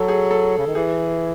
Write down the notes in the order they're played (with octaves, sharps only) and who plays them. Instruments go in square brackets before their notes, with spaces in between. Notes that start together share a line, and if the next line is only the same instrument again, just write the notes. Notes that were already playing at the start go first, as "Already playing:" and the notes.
Already playing: [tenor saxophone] F#3 [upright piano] A4
[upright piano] G#4
A4
[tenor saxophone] C#3
D#3
[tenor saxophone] E3 [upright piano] G#4